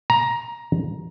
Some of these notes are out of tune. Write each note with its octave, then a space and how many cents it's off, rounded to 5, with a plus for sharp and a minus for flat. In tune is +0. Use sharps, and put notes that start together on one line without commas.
A#5 +15